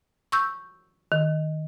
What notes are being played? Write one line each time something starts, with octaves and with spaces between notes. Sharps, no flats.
C#6 E6 G6
D#3